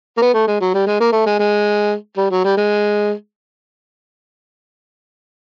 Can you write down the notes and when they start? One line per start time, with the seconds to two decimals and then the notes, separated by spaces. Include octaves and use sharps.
0.17 A#3
0.22 B3
0.34 A3
0.47 G#3
0.61 F#3
0.74 G3
0.87 G#3
1.00 A#3
1.12 A3
1.26 G#3
1.39 G#3
2.17 G3
2.31 F#3
2.44 G3
2.57 G#3